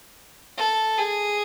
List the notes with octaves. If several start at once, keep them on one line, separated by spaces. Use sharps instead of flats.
A4
G#4